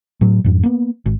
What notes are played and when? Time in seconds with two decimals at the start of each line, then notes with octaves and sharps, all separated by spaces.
0.21 A2 F#3
0.44 F2 G#2
0.63 A#3 B3
1.06 G#1